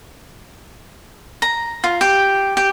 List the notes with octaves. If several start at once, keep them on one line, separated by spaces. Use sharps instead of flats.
A#5
F4
G4
G4